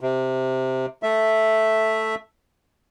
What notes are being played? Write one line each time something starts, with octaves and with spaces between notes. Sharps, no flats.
C3
A3 E5